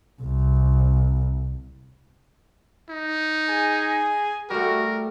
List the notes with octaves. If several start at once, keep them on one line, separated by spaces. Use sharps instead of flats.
C2
D#4
G#4 G#5
G3 A3 F#4 A#4